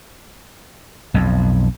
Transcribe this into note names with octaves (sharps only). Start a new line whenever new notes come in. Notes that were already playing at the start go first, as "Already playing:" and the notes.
B1 F2